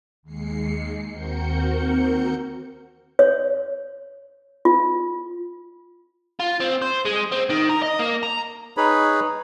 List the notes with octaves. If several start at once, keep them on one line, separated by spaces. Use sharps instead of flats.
D#2 G#3 C7 C#7
D#2 C4 F#4 A#4 G6 C#7
C#5
F4
F4
C4
C5
G#3
C4
D#3
A#4
D#5
A#3
A#5
D#4 G#4 B4 C#5 B5